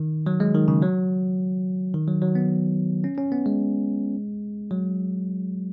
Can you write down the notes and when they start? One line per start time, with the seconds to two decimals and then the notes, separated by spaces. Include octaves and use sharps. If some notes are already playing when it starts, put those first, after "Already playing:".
Already playing: D#3
0.26 F#3
0.40 G#3
0.55 D#3
0.68 C#3
0.82 F#3
1.94 D#3
2.08 F#3
2.22 F#3
2.35 B3
3.04 C#4
3.18 C#4
3.32 B3
3.46 G#3
4.71 F#3